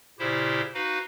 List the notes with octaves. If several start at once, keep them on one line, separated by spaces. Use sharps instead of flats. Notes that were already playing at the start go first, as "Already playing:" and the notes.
A#2 C#3 E4 G4 C5
D#4 F#4 B4 F5